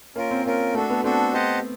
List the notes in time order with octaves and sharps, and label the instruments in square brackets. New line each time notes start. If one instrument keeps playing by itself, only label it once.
[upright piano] A#3 [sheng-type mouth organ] C#4 F4 A#4
[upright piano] C4
[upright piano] A#3 [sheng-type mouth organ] C#4 F4 A#4
[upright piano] A3 [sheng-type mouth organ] D4 F#4 A4
[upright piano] B3
[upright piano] C4 [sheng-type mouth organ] D4 F#4 A4
[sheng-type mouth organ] G4 C5 D#5 F#5 A5